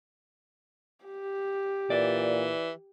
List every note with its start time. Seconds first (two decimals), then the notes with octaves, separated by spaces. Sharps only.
1.06 G4
1.90 A#2 E3 D5